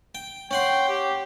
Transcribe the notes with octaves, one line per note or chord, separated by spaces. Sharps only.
G5
C#4 F#5 G5 C6
G4